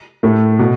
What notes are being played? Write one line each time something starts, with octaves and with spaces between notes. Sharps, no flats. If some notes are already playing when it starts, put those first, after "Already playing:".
A2 A3
B2